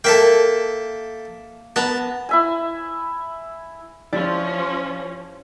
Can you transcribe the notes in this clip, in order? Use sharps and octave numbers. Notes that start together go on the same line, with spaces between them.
A#3 A4 E5 G5
B3 A5 A#5
E4 E5 G#5
F3 C#4 E4 G4 D5